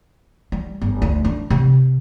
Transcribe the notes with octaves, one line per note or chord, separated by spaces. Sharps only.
G3
G1
D2
D4
C3